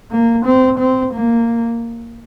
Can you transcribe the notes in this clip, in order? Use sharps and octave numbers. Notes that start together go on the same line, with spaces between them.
A#3
C4
C4
A#3